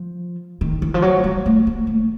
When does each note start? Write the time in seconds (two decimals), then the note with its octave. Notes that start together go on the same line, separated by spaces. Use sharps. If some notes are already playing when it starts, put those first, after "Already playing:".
Already playing: F3
0.61 D#3
0.82 E3
0.94 F3
1.02 F#3
1.24 G3
1.46 A3
1.67 A#3
1.87 A3